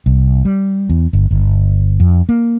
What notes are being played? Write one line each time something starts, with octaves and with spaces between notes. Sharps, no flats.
C2
G3
E2
G1
G1
F2
A#3